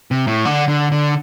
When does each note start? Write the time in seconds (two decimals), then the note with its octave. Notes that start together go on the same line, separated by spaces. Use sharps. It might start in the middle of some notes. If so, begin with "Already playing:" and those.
0.11 C3
0.27 A2
0.45 D3
0.68 D3
0.92 D3